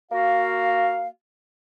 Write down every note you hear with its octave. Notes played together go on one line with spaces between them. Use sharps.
A#3 F#4 F5